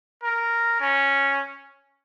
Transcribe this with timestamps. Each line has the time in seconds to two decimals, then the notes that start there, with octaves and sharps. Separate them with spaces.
0.23 A#4
0.80 C#4